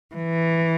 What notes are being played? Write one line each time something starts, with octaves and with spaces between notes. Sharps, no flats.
E3